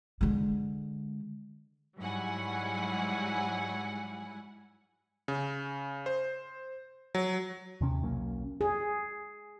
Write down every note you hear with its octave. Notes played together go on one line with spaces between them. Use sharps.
D3 G#3
G#2 F#3 G3 E4 F#5 G#5
C#3
C5
F#3
D#2 C3 C#4
B1 F#3 A#3 C#4
G#4